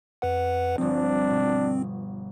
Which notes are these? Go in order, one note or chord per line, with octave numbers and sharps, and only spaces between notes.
F2 B4 F#5
G1 F3 C4 D4
B2